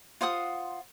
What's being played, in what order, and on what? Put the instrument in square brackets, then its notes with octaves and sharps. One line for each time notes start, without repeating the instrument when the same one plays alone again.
[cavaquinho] F4 C5 F#5 D#6